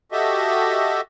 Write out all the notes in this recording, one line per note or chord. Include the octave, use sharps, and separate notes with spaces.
F#4 G4 A4 D#5 E5